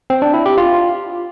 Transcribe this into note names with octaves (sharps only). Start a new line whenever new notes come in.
C4
D4
E4
G4
F4